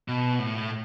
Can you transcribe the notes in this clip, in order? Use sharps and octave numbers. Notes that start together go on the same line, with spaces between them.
B2
A2